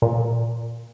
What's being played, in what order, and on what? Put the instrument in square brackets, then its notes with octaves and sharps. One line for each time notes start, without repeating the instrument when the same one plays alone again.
[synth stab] A#2